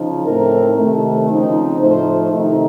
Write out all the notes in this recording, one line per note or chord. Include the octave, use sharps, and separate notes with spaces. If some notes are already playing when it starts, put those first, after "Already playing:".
Already playing: C#3 F3 D#4
A2 A3 C4 D#4 A#4
C3 D#3 A3
C#3 F3 C4 D#4
A2 F3 A3 D#4 C5
C3 D#3 A3 D#4